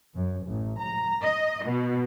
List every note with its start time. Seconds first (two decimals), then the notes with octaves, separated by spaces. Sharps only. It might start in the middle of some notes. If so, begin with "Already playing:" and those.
0.15 F#2
0.47 A1
0.81 A#5
1.22 D#5
1.65 B2